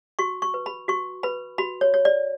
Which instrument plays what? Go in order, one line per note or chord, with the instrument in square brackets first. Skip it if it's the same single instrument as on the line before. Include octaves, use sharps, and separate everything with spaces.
[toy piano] F#4 C#6
C#6
B4
B5
F#4 C#6
B4 B5
F#4 B5
C#5
C#5
D5